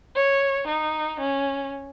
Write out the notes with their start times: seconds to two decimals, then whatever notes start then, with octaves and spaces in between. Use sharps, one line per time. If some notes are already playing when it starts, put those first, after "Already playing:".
0.16 C#5
0.67 D#4
1.20 C#4